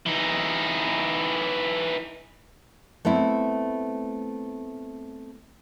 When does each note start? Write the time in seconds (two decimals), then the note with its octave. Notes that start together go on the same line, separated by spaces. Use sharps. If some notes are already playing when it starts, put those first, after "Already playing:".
0.06 E3 D#4
3.05 A3 B3 C4 E4